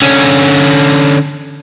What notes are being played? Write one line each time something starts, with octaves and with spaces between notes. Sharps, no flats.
D3 C#4